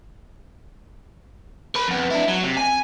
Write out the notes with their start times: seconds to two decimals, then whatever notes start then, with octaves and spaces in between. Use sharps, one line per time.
1.75 A#4 B5
1.88 F2 B3
2.10 D4 E4
2.28 F#3
2.43 C3
2.57 G#5